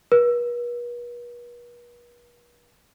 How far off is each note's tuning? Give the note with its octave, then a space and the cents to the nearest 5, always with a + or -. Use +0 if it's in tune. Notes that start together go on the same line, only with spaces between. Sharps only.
B4 -45